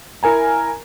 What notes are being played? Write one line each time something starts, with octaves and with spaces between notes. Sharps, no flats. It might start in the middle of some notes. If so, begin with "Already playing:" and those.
E4 A#4 G#5 A#5